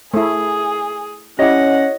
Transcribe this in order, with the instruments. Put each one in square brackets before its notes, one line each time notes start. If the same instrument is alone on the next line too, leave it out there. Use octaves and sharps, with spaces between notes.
[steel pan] A3 E4 [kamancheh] G#4
[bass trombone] C#4 [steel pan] E4 G4 [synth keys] C#5 D#5 A#6 [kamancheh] F#5